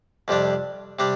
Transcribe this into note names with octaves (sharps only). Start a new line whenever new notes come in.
F2 C3 G3 D4
C3 G3 D4